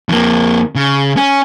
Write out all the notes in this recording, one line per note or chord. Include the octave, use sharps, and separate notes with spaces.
F2 A#3
C#3
C#4